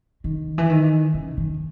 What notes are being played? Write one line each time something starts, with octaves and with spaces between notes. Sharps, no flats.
D#3
E3
D#3
C#3
D#3